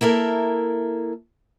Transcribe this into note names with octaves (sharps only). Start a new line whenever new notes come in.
A#3 E4 A4 A#4